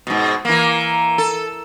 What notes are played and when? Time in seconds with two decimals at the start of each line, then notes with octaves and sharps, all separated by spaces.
0.07 G#2 B2
0.45 E3 A#3
1.18 A4